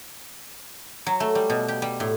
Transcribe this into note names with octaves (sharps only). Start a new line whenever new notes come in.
F#3
A3
G3
B2
G4
G3
A2